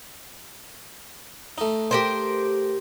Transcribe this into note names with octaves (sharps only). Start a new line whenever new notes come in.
A3 D#4
G4 A#4 C5